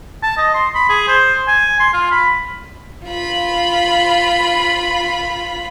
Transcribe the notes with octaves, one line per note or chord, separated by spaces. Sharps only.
A5
D#5
C6
B5
G#4
C5
G#5
C6
F4
B5
F4 B5